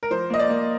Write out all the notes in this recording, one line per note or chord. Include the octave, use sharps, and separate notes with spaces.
A#4
F3 C5
A#3 D#5
D5
A#3